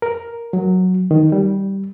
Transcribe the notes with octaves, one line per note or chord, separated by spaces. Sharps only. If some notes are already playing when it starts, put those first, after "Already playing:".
A#4
F#3
D#3
G3